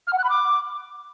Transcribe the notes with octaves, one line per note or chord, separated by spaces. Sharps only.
F6
F#5
F#6
B5
D6